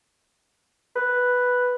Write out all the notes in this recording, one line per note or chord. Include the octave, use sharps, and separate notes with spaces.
B4